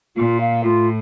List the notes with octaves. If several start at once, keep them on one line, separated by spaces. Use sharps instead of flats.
A#2 F4
F5
A2 F4